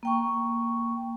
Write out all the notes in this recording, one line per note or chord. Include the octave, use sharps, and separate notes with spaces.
A#3 G5 C#6